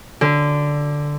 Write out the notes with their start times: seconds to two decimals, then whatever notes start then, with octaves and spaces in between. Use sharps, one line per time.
0.21 D3